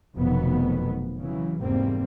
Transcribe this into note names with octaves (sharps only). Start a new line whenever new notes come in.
F1 F2 B2 D#3 F#3 B3
C#3 E3 F#3
F1 E2 G#2 G3 A#3 C4